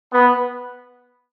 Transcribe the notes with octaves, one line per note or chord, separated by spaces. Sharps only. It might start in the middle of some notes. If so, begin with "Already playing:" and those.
B3